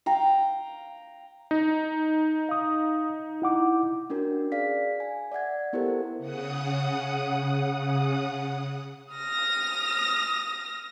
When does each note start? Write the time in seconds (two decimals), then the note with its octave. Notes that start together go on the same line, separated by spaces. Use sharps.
0.06 F5 G5 A#5
1.51 D#4
2.49 F5 D#6
3.42 E4 F#5 D6
4.10 C#4 D4 F#4 A#4
4.52 G#4 D5 F5 B6
5.00 G#5
5.32 D5 E5 F#5 G#6
5.73 B3 E4 G4 A4 A#4 C5
6.18 C#3 F#5 D#6
9.12 D#6 F6 A#6